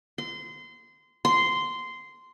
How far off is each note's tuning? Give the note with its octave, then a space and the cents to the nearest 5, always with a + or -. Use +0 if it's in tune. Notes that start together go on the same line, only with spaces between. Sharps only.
C6 -25
C6 -10